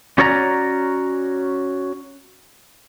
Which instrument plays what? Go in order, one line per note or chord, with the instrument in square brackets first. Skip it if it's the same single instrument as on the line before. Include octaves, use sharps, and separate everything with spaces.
[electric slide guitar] C#4 F#4 C#5 D5 G5 A#5